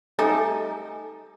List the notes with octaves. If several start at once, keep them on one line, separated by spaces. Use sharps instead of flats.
G3 A3 D#4 A4 G#5 A#5